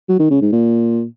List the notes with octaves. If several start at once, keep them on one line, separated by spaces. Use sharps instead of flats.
F#3
D#3
C#3
G#2
A#2